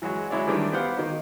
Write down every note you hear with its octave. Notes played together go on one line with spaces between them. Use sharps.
E3 F#3 G#3 F#4
F#3 G#3 E4 C#5 D5
D#3 E3 G3 A3 D4
B3 G4 C5 F5 F#5
D#3 D#4